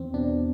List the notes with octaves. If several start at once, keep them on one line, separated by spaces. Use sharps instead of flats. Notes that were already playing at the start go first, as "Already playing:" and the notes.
Already playing: E2 C4
B2 D4